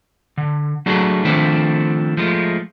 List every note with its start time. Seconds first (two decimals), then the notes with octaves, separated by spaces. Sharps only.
0.38 D3
0.86 F#3 A3 D4 F#4 G#4
1.25 D#3 F3 A3 C4 D4
2.17 F3 G#3 A3